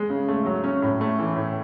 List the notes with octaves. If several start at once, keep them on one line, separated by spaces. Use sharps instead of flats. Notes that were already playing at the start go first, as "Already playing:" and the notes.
Already playing: G#3
C#3
A3
F#3
C#4
A2
A3
E3
A2